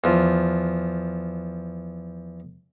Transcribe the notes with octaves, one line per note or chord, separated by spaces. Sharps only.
E2 F3